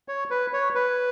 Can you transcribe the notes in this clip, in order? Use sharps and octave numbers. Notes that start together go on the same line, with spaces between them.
C#5
B4
C#5
B4